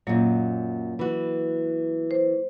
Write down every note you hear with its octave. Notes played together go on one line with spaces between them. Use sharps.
F#2 A#2 F#3 A#3
E3 F#4
C5